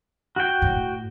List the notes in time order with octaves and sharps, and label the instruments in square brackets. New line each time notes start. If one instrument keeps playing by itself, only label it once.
[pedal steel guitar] F#4 G5
[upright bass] A2